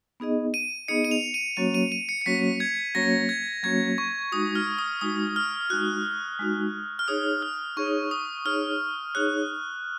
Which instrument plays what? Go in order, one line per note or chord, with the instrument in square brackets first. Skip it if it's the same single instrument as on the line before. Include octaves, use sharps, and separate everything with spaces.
[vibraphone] B3 D#4 G#4 D#5
[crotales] D#7
[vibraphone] B3 D#4 G#4 D#5 [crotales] C#7
[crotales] D#7
F7
D#7
[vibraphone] F#3 A#3 C#4 F#4 C#5 [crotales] D#7
[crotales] D#7
D#7
C#7
C#7
[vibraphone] F#3 A#3 C#4 F#4 C#5 [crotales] B6
[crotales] G#6
[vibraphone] F#3 A#3 C#4 F#4 C#5 [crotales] A#6
[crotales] G#6
[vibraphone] F#3 A#3 C#4 F#4 C#5 [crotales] G#6
[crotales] C#6
[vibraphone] G#3 D#4 F#4 [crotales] D#6
[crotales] F6
D#6
[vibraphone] G#3 D#4 F#4 [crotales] D#6
[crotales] F6
[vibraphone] G#3 D#4 F#4 [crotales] F#6
[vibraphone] G#3 D#4 F#4
[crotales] F6
[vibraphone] D#4 G#4 C#5 [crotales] D#6
[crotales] F6
[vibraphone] D#4 G#4 C#5 [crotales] C#6
[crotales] D#6
[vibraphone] D#4 G#4 C#5 [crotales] F6
[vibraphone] D#4 G#4 C#5 [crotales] F#6